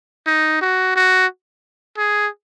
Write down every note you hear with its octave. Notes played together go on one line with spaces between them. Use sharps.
D#4
F#4
F#4
G#4